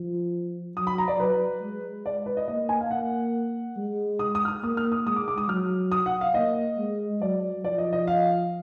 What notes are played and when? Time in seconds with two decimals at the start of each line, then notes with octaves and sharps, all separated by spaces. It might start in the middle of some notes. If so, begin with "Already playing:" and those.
Already playing: F3
0.76 F#3 D#6
0.87 B5
0.98 A#5
1.08 D5
1.19 F#3 B4
1.62 G#3
2.06 D5
2.26 B4
2.37 D#5
2.48 A#3 D#5
2.69 G#5
2.81 F5
2.91 A#3 F#5
3.77 G#3
4.19 D#6
4.35 D#6
4.45 F6
4.48 D#6
4.63 A#3 D#6
4.77 F6
4.92 D#6
5.06 G#3 D#6
5.16 D6
5.28 D6
5.38 D#6
5.48 F#3 F6
5.92 D#6
6.06 F#5
6.21 F5
6.34 A#3 D#5
6.78 G#3
7.21 F#3 D5
7.64 F3 D5
7.78 D#5
7.93 D#5
8.07 F5